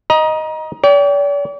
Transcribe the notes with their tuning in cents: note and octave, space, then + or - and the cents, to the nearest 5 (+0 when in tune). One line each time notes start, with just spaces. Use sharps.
D#5 +0 A#5 +30
D5 -45 G5 +0